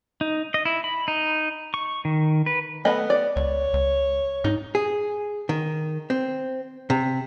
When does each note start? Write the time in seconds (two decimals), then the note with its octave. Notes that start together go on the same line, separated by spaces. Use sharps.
0.21 D#4
0.54 D#5
0.65 E4
0.84 B5
1.08 D#4
1.74 C#6
2.05 D#3
2.46 B4
2.85 A3 B3 D#5 B5
3.10 D5
3.36 C#2 C#5
3.74 C#2
4.44 G#2 D#4
4.75 G#4
5.49 D#3
6.10 C4
6.90 C3